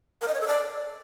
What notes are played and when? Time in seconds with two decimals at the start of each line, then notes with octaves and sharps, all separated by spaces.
0.21 A#4
0.28 D#5
0.34 C#5
0.41 A4
0.47 D5